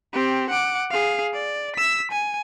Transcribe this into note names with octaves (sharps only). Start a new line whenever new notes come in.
C4 G4
F#5 D6
G#4 F5
D5
E6 B6
G#5